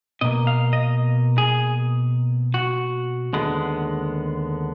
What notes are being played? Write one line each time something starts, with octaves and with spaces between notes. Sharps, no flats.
B2 A#3 D#5
F5
D#5
G#4
F#4
D#2 D3 G#3 B3